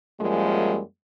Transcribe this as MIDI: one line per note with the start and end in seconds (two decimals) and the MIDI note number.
0.19 0.80 42
0.19 0.80 53
0.19 0.80 55
0.19 0.80 56
0.19 0.80 58